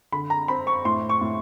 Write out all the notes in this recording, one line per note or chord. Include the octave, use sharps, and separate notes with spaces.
D3 B5
A#5
C4 B5
C#6
A2 C6
C#6
A2